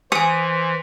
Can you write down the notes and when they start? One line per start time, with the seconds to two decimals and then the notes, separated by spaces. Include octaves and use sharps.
0.12 E3 C5 G#5 D#6 C#7